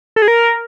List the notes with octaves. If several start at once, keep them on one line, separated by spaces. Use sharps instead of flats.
A4
G#4
A#4